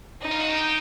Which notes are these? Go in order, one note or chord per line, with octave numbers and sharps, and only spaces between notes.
D#4
F4
F#4
G4